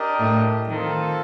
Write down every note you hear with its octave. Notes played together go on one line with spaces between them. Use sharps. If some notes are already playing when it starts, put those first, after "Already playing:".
Already playing: D4 G4 A#4 D#5
A2
D#3 C4 F4 A4